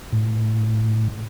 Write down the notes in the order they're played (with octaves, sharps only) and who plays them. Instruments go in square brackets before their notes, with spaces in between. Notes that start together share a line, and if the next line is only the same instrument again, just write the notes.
[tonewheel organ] A2